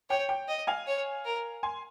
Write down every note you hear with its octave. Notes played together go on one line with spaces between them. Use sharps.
C#5 G5
G5
D#5
F5 G#5
C#5
A#4
G#5 C6